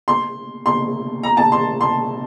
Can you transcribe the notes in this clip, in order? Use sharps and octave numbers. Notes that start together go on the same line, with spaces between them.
C6
C6
A#5
A5
C6
C6